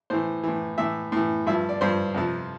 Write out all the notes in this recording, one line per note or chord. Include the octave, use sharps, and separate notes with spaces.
A2 E3 C5
A2 E3
A2 E3 E5
A2 E3
G2 F3 E5
D5
G2 F3 C5
F2 C3 F3